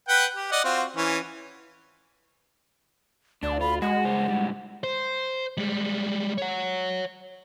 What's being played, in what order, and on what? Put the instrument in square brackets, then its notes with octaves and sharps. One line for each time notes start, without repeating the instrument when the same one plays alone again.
[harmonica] B4 F#5 G5
G4
D5 D#5 F#5
C4 F4 F#4
E3 C#4
[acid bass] D2 [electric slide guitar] D4 [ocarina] D5
[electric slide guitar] F4 [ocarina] B5
[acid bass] G#3 [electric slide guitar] F#4 [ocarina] F#5
[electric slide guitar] G2 C#3 C5
A2 G3
[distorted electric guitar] C5
G3 G#3
C#5 F#5